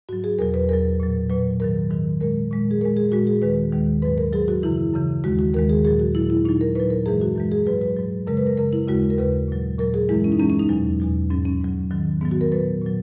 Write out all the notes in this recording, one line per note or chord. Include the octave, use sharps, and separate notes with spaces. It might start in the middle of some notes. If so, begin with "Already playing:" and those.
G#2 F#3 F#4
G#4
E2 B2 F#3 A#4
B4
E2 B2 F#3 A#4
A#2 F#3
A#2 F#3 B4
G#2 D#3 F#3 A#4
G#2 D#3 F#3
A#2 G#3 A#4
A#2 G#3
G#4
A#2 G#3 A#4
G#4
A#2 G#3 F#4
G#4
D#2 D#3 G#3 B4
D#2 D#3 G#3
G#2 F#3 B4
A#4
G#2 F#3 G#4
F#4
F#2 C#3 E3 E4
F#2 C#3 E3
D#2 D#3 G#3 F#4
F#4
D#2 D#3 G#3 A#4
G#4
A#2 F#3 G#4
F#4
A#2 F#3 E4
E4
A#2 F#3 D#4
A#4
A#2 F#3 B4
A#4
F#2 E3 G#3 G#4
F#4
F#2 E3 G#3
G#4
G#2 F#3 B4
B4
G#2 F#3
F#2 C#3 G#3 A#4
B4
A#4
F#2 C#3 G#3 A#4
E4
D#2 C#3 G#3 F#4
A#4
D#2 C#3 G#3 B4
A#2 F#3
A#2 F#3 A#4
G#4
F#2 E3 G#3 E4
C#4
D#4
F#2 E3 G#3 C#4
C#4
D#4
E2 B2 F#3
E2 B2 F#3
G#2 F#3 C#4
C#4
G#2 F#3
G#2 D#3 F#3
G#2 D#3 F#3 B3
F#4
A#4
A#2 F#3 B4
A#2 F#3